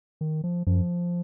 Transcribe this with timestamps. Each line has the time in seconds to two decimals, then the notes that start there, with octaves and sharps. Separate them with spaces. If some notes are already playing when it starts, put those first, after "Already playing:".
0.21 D#3
0.44 F3
0.67 F#2 F3